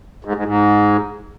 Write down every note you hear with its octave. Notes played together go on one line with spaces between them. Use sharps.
G#2
G#2
G#2